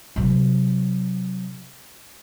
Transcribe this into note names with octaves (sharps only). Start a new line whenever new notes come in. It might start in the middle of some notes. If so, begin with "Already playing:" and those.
C3 F#3